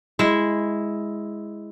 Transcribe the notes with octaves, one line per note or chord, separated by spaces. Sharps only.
G#3 E4 E5